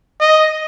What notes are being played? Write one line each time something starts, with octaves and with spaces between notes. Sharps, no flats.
D#5